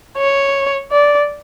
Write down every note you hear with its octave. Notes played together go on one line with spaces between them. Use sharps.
C#5
D5